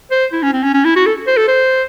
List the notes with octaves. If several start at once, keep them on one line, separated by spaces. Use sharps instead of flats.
C5
E4
C#4
C4
C#4
C#4
E4
F#4
A4
C5
A4
C5